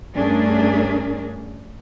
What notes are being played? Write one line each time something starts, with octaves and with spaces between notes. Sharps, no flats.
G2 A3 C#4 D4 G#4 A#4